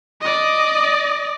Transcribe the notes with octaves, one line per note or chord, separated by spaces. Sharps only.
D5 D#5